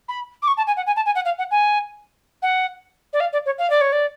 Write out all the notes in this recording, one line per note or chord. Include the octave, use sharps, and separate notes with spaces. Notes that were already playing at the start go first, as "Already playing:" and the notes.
B5
D6
C#6
A5
G#5
F#5
G#5
A5
G#5
F#5
F5
F#5
G#5
F#5
D5
F5
D5
C#5
F5
D5
C#5
D5